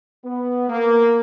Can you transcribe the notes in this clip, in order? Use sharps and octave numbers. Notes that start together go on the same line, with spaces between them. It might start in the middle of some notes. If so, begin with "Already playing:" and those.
B3
A#3